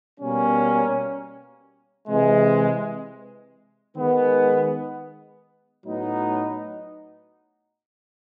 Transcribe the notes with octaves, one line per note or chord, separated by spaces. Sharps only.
B2 G3 A#3 C#4
C3 E3 G#3
D#3 G#3 B3
A2 F#3 B3 D#4